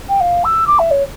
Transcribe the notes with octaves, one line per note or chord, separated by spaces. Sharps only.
G5
F5
E6
D6
E5
C#5